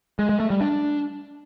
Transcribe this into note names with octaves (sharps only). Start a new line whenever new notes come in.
G#3
G#3
A3
G3
D4